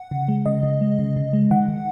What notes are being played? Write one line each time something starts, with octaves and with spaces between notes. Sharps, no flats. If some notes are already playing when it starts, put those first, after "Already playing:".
Already playing: F#5
C#3
G#3
C#3 D#5
C#3
G#3
C#3
C#3
G#3
D#3 F#5
D#3